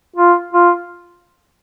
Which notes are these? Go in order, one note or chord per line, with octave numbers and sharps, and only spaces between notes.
F4
F4